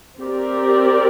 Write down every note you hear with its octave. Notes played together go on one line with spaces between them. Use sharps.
C4 G4 A#4 D5